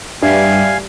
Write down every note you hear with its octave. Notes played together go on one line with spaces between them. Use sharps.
G2 G3 E5 F5 G#5 F6 B6